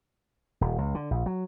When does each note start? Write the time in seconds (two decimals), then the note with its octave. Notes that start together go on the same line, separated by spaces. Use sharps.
0.61 D#1
0.78 C#2
0.95 D3
1.11 A#1
1.26 F#3